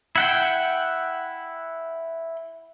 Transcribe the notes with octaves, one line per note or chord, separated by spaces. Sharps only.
E4 F#5 G5